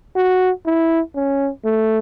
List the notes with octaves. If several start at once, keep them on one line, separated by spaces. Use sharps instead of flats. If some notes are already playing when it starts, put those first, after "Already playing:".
F#4
E4
C#4
A3